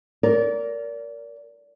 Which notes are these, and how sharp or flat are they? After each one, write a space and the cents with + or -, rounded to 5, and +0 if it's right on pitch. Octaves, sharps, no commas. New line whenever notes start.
A#4 +0 D5 -30